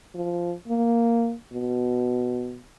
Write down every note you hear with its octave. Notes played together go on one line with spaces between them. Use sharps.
F3
A#3
B2